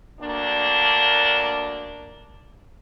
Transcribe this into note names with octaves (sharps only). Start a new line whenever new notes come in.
D2 A#3 D4